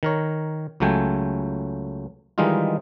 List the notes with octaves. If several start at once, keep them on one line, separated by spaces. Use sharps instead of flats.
D#3 A#4 C#5
C#2 C#3 F#3 A3 G5 G#5
D#3 E3 G3 G#3 D#4 F4